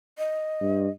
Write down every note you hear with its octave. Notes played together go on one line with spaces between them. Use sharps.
D#5
G2